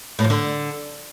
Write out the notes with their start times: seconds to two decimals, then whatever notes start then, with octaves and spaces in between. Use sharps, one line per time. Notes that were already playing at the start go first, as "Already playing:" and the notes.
0.19 A2
0.24 F3
0.30 D3